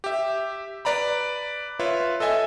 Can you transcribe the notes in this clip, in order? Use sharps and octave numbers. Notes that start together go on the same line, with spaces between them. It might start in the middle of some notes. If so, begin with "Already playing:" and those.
G4 E5
B4 D5 A#5 B5
F4 B4 C#5 E5
A4 D#5 E5 G#5